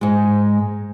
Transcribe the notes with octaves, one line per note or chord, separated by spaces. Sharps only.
G#2 G#3